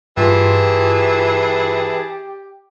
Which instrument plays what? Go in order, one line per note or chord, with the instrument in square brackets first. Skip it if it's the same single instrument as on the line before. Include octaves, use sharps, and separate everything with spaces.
[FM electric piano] G2 F4 C6 [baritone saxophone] E3 [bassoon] G4 [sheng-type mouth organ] G#4 A5